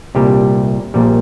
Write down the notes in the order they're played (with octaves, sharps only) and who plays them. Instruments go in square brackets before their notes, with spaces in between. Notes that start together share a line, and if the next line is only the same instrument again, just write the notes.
[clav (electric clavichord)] C2 A#2 G3 G4
A#1 A#2 G3